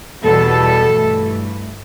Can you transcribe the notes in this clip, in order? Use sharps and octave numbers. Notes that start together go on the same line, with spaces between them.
E2 B2 G3 B3 A4
G2 E3 A3